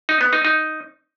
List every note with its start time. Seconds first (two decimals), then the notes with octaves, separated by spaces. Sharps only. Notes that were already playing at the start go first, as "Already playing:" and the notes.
0.09 D#4
0.21 B3
0.33 D#4
0.45 D#4